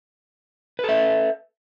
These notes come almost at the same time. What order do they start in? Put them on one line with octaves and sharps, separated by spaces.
B4 A4 E5